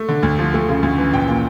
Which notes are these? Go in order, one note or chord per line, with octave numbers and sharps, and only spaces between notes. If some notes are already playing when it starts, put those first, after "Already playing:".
Already playing: A3
D3
D2
F3
A3
C#3
D2
E3
A#1 G5
A#2